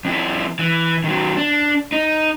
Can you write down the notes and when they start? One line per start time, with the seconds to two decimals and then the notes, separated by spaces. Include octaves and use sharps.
0.05 F2 E4
0.59 E3
1.04 D#3 F#3
1.37 D4
1.92 D#4